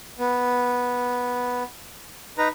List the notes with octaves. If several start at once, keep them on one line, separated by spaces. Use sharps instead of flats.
B3
D#4 B4 A#5